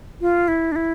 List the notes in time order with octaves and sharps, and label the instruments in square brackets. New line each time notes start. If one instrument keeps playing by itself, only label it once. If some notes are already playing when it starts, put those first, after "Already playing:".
[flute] F4
E4
D4
E4